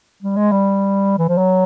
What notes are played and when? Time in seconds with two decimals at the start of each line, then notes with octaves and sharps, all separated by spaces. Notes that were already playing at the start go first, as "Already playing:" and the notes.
0.22 G3
0.36 G#3
0.52 G3
1.19 E3
1.29 F3
1.38 F#3